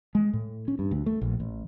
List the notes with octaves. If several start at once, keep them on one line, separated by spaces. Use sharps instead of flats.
G#3
A2
C#4
G2
D2
A3
A#1
A1